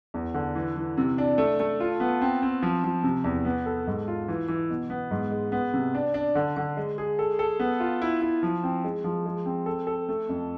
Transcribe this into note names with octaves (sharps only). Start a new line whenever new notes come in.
E2
D3
E3
E3
C3
D4
A3
A3
F4
B3
C4
C4
F3
F3
C3
E2
B3
A4
G#2
F4
E3
E3
B2
B3
G#2
G#3
B3
C3
D4
D4
D3
D3
G#3
G#4
A4
A4
B3
F4
E4
E4
F3
C4
G#3
F3
G#3
C4
A4
A4
A3
F2